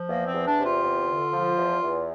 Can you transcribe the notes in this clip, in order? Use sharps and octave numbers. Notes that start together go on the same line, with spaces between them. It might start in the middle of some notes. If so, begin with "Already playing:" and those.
Already playing: F3
E2 A#3
C4
E2
D4
C3
F4
E2
D3
F3
E2
E2